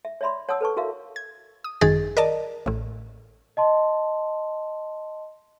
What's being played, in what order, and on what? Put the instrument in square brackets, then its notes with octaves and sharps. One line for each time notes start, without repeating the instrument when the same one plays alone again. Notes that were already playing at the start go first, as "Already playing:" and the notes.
[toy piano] E5
C#5 D5 E5 B5 C6
C#5 F#5 A5 D#6 E6
A4 B4 A5 C#6
E4 F#4 A#4 E5 F5
[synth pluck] G#6
D#6
G#1 F#2 D#3 G#4 A6
A#4 D5 D#5 A5
A1 A2
[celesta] D#5 A5 C6